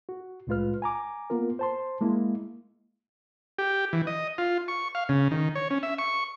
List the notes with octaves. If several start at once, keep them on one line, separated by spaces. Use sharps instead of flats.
F#4
C2 A2 G#3 F4 B4 F6
G#5 A#5 D6
A#3 B3 F4 A#4
C5 A5 C6
G#3 A#3 E4
G4
E3
D#5
F4
C#6
F5
C#3
D#3
C#5
C#4
E5
C#6